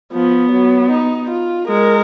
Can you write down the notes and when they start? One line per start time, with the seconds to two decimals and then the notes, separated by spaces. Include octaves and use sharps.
0.13 F3 B3
0.51 F#3
0.91 D#4
1.30 F4
1.68 G#3 A#4